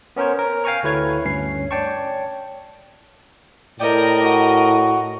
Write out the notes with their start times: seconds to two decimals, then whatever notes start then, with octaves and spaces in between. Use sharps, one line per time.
0.16 B3 C#4 A#4 C5 C#5
0.39 A#4
0.64 F5 G5 G#5 A#5 C#6 F6
0.83 D2 A3 E4 B4 C#5 G#6
1.25 D2 G2 C#4 C7
1.71 C#5 D5 G5 A5 C#6
3.80 A2 A#4 D5 D#5 G5
4.23 F#4